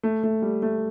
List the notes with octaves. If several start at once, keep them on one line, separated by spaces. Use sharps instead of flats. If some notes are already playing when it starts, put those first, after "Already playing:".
A3
A3
G3
A3